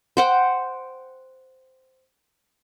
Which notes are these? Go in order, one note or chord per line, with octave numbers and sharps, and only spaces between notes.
C5 F#5 G5